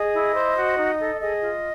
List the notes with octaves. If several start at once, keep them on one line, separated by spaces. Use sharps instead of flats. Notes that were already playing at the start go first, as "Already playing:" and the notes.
Already playing: G#4 D#5
E4
C5
F#4
D#4
A4
G#4 D#5
F4